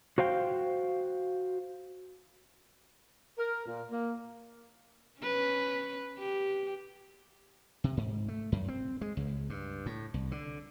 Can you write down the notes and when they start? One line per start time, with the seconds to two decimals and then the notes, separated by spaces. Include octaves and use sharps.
0.18 F#4 C5 F5 G5
3.38 A#4
3.65 A#2
3.90 A#3
5.21 C#4 B4
6.18 G4
7.84 C3
7.97 G#2
8.28 A3
8.52 F#2
8.68 C4
9.01 G#3
9.17 C#2
9.50 G2
9.86 A2
10.14 C2
10.32 D3